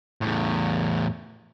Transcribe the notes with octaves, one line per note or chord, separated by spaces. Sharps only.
E2 A2